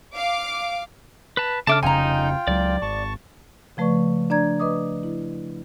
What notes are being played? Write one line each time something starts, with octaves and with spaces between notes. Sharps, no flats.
F5 D6
B4 A5
C#3 D4 A4 E5 A5 D6 F6
F1 C#3 D#4 F4 G5 G#5 A#5
C#2 F#3 D5
G#1 A5 C#6
C#3 F3 A3 B4 D5 C#6
D4 D5 A#5 G#6
B4 D#5 D6 D#6
E4